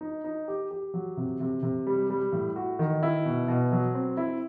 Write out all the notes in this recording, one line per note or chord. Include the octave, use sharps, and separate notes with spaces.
D#4
D#4
G4
G4
F#3
C3
C3
C3
G3
G3
A2
F#4
D#3
E4
B2
B2
F#3
C4
E4